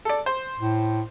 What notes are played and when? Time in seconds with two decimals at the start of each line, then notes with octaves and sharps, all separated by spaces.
0.05 A4 D5
0.26 C5
0.58 A2